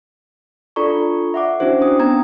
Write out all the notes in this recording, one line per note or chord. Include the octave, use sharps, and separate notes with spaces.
D4 F4 A4 D5 A#5 C#6
E5 F#5 D6
C#4 D4 E4 F#4 C5
C#4 D4 G5 D#6
B3 C4 A#5 G#6